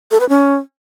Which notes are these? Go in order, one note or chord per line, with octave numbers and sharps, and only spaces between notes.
A4
B4
C#4